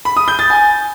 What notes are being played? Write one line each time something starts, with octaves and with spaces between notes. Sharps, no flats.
B5
D#6
G6
A6
G#5